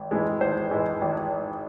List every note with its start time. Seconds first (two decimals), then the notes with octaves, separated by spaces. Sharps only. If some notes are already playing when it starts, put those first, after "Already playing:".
Already playing: G#1
0.11 G#2 E3 G#3
0.41 G#1 C5
0.71 G#2 E3 G#3
1.01 G#1